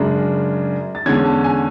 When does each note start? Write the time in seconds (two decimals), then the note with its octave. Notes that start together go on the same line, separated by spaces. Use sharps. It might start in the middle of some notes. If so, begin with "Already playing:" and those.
Already playing: F#2 C#3 G#3 D4
0.95 A6
1.06 E2 D3 G#3 C#4 G#6
1.25 A5
1.44 G#5